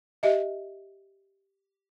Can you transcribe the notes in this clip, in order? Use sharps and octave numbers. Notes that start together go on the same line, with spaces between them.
G4 D#5 E5